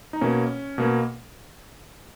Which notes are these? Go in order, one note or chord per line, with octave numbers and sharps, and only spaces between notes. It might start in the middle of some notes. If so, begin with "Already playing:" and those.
D#4
B2 A#3 C#4
B2 A#3